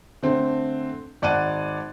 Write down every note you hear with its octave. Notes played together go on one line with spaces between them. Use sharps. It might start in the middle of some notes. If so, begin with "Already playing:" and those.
D3 A3 C4
G#1 D5 F#5 A5 F#6 D#7